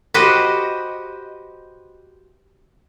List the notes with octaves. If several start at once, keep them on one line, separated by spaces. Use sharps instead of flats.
F#4 G4 B4 C5 D#5